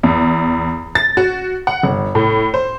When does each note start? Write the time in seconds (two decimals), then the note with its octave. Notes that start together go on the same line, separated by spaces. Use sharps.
0.03 E2
0.95 A6
1.17 F#4
1.67 F#5
1.83 G1
2.15 A2
2.54 C5